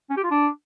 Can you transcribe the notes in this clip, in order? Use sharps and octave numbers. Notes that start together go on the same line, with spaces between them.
C#4
G4
F4
D4